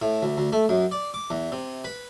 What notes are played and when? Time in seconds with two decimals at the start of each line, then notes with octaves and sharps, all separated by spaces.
0.02 A2
0.23 D2
0.38 D2
0.53 A3
0.69 F#2
0.92 D5
1.14 D6
1.30 E2
1.52 C3
1.84 B4